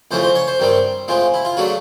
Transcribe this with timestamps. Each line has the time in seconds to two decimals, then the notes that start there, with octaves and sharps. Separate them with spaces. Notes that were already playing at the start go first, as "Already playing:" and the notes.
0.11 F2 C#3 E3 A3 C#4 C5
0.23 C5
0.35 C#5
0.48 C5
0.60 G2 D#3 G3 C4
1.08 A2 F3 G#3 C4
1.34 E4
1.45 F4
1.57 C#3 F#3 A3 D4 F#4